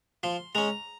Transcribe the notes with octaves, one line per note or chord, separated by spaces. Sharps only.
F3 C6
G#3 C#4 A#5